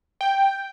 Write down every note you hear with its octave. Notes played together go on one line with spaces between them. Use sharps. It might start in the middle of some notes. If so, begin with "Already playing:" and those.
G5